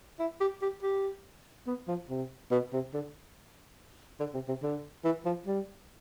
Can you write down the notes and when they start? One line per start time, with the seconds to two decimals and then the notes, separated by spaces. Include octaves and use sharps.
0.19 E4
0.40 G4
0.62 G4
0.83 G4
1.67 B3
1.88 F3
2.09 C3
2.51 B2
2.73 C3
2.94 D3
4.20 D3
4.34 C3
4.48 C3
4.62 D3
5.04 E3
5.26 F3
5.47 G3